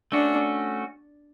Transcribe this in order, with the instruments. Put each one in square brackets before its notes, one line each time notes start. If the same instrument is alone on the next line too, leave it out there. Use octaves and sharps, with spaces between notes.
[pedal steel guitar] A3 C#4 F#4 [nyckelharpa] D4